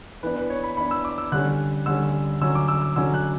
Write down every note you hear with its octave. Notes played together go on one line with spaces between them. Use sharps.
E3 B3 D4 B4
B4
C#5
B5
E3 B3 D4 B5
E6
D6
E6
D3 G3 C#4 F#6
D3 G3 C#4 E6
D3 F#3 C#4 E6
D6
E6
E6
D3 F#3 C#4 E6
F#6